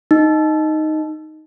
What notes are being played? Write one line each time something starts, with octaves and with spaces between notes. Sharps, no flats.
D#4